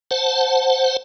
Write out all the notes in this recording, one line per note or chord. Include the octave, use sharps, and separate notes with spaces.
C5 F#5 A5